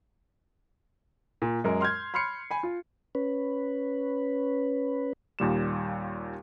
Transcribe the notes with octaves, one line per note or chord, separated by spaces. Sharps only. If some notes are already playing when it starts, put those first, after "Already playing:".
A#2
F#2 G#3 A#4
C6 F6 G6 G#6
B5 C6 F6 C7 C#7
G#5 B5
F4
C#4 B4
D#2 A#2 G3 E7